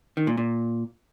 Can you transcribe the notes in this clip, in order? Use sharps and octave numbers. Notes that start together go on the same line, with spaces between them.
D#3
A#2
A#2